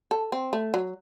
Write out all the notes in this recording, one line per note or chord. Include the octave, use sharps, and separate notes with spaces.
A4
C4
A3
F#3